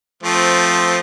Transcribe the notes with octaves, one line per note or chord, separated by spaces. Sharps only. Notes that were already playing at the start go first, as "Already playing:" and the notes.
F3 A3 C4